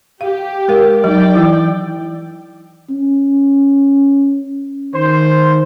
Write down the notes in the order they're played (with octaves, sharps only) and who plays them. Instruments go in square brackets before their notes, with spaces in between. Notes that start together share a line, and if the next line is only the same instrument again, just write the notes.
[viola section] G4 [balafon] F5
[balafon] G#3 A#4 F5
[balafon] F#3 D#4 [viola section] D5 G5
[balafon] E3 E4
[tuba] C#4
[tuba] D#3 [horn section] C5